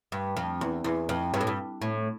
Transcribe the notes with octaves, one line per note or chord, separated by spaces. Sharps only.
G2
F2
E2
E2
F2
G2
A2
G2
A2